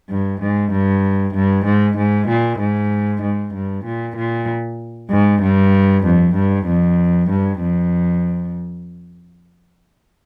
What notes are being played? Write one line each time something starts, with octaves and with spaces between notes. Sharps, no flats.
G2
G#2
G2
G2
G#2
G#2
A#2
G#2
G#2
G2
A#2
A#2
G#2
G2
F2
G2
F2
G2
F2